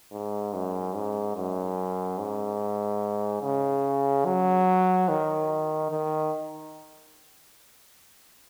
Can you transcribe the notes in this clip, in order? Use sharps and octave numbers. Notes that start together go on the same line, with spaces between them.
G#2
F#2
G#2
F#2
G#2
C#3
F#3
D#3
D#3